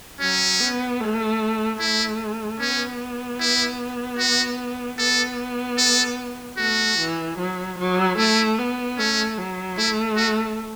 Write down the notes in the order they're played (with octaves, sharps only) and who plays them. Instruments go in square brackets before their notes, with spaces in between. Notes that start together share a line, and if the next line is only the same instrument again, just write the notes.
[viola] F#3 [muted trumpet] C#4
[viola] B3
A3
[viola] A3 [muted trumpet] E4
[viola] B3 [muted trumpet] C#4
[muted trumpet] E4
F#4
[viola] B3 [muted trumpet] A4
[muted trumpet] A4
[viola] A3 [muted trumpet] F#4
[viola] E3
F#3
F#3
[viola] A3 [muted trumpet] E4
[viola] B3
[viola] A3 [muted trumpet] C#4
[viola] F#3
[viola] A3 [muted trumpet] E4
[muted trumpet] F#4